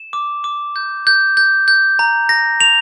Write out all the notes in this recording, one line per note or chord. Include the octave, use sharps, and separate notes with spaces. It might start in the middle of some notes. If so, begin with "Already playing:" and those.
Already playing: E7
D6
D6
G6
G6
G6
G6
A#5
A#6
F7